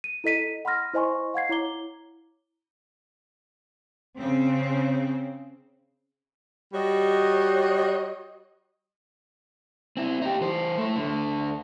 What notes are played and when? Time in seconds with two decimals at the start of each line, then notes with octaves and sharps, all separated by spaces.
0.04 D#7
0.24 E4 A4 D#5 B6 D#7
0.65 F#5 B5 C6 F6 A#6
0.93 E4 C5 D#5 G#5 C6 C#6
1.34 F5 F#5 G#6 C7
1.49 E4 C#5 A#5 D6 G7
4.18 C#3 C4
6.73 G3 F#4 C#5 D#5
9.97 C4 E4
10.21 D#4 G4
10.41 E3 C5
10.78 A3 E4
10.96 D2 D3